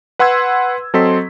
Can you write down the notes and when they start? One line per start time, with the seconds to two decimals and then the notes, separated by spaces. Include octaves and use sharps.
0.19 B4 F#5 C6 E6 G#6
0.94 F#3 C4 A4 D#5 C6 B6